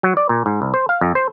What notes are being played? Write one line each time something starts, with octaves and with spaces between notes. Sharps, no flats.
F#3
D5
A#2
G#2
C2
C5
F5
F2
C5